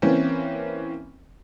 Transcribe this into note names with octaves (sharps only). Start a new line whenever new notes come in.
E3 A#3 C4 C#4